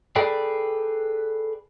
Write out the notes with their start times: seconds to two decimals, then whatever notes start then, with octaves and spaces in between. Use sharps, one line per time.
0.16 G#4 A4 B4 D5 G5